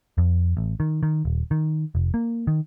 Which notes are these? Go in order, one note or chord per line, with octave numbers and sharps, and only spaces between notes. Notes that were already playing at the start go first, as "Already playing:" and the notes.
F2
A1
D#3
D#3
D#1
D#3
F1
A#3
D#3